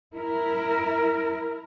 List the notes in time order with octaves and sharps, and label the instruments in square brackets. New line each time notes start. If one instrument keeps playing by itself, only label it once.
[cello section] E4 A#4